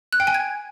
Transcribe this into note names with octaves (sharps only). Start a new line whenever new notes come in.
F#6
G5
G#5
G#6